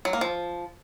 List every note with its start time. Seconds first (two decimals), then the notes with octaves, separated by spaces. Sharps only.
0.05 F#3
0.13 A#3
0.21 F3